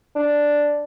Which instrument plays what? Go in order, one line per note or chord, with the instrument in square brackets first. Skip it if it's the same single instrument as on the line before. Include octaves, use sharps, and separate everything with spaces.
[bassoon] D4